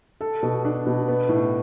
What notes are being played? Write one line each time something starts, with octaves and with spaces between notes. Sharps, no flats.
A4
B2
D4
B2
B3
A2